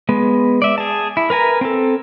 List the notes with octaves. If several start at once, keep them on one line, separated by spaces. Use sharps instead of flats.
G#3 B3
D5 E5
G#4 A5
E4
A#4 B4 G#5 A#5
C4 A4